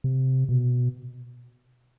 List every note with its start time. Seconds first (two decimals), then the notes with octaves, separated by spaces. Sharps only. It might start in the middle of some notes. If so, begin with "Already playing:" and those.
0.04 C3
0.49 B2